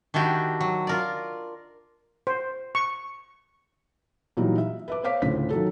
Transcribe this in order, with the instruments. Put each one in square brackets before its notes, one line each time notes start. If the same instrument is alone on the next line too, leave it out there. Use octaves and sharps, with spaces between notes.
[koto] D#3 D4 E4 F#4 G4
F#3
F4 A#4 D5
[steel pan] C5
C#6
[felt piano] A#2 E3 F#3 G3 D#4 E4
E5
B4 E5 D6
C5 C#5 F5 D6 B6
D2 A2 C#3 C#4 F4 B6
D#3 F#3 A4